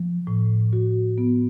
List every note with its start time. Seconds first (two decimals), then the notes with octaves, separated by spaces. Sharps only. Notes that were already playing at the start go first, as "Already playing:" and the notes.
Already playing: F3
0.27 A2
0.73 F#4
1.18 B3